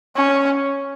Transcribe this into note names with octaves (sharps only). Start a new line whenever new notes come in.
C#4